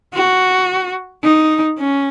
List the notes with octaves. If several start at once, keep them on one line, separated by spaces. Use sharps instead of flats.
F#4
D#4
C#4